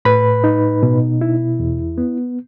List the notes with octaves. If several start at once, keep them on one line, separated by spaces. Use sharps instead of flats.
A2 B4 B5
D#4
B2
E4
E2
B3